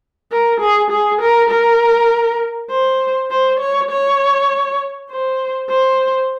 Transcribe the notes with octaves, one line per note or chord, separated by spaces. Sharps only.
A#4
G#4
G#4
A#4
A#4
C5
C5
C#5
C#5
C5
C5